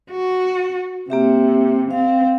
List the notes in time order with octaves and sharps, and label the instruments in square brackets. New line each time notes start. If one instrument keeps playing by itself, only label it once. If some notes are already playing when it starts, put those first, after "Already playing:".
[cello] F#4
[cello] C3 [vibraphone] A#3 G4 E5
[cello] C4 [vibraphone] F5